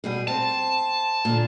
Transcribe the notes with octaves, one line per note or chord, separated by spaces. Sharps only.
B2 G3 G#4
C4 A5
A#2 D3